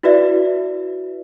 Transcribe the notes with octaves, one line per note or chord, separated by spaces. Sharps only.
E4 F#4 B4 D5 E5